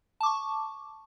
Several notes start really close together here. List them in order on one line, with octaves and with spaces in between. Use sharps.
A5 D6 C#6